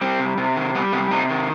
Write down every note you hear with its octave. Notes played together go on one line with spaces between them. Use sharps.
G3 C4
C3
C3
D#3
G3 B3
C3 B3
C3 D#4
D#3